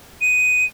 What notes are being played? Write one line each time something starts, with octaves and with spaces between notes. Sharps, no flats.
D#7